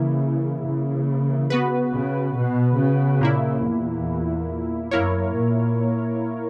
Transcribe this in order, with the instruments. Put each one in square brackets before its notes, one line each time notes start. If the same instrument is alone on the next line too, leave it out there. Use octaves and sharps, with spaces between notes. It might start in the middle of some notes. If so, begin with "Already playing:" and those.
Already playing: [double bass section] C#3 [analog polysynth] E3 A#3 E4
[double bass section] C#3
[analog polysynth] B3 F#4 B4
[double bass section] C#3
B2
C#3
[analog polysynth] A#2 A#3 E4
[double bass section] E2
[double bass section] F#2 [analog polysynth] A#3 E4 A#4 C#5
[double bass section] A#2